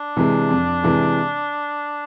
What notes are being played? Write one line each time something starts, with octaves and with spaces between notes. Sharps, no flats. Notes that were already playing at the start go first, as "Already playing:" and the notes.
Already playing: D4
C3 E3 G#3
F2
C3 E3 G#3